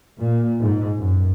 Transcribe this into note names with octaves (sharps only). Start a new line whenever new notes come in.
A#2
G#2
F#2